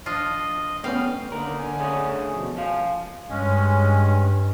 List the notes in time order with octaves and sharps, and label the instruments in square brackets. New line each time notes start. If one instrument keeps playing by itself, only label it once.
[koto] F3 D4 F4 [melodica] D#5
[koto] G3 F5 G5 [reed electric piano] A3 B3 C#4
[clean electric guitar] D#2 A#4 [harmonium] D3 A#3
[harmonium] D3 G#5
[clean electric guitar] A3 C#4 G#4
[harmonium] B2 F3
[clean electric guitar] F3 F5 [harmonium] G#5
[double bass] G2 [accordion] G#3 C#4